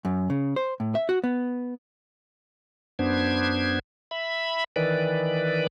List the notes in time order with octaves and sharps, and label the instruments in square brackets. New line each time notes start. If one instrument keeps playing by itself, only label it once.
[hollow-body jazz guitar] F#2
C#3
C5
A2
E5
F#4
B3
[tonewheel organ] F#2 B3 D4 C5 G#6
E5 B5
D#3 E3 B4 D5